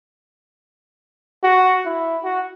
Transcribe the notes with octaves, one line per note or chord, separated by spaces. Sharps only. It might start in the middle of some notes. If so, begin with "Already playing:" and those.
F#4
E4
F#4